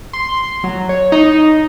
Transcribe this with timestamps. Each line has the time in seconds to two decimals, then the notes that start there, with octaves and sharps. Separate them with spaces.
0.13 C6
0.64 F#3
0.89 C#5
1.12 D#4